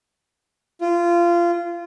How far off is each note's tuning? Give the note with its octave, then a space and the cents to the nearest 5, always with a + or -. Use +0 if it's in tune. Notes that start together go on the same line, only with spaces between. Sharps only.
F4 -20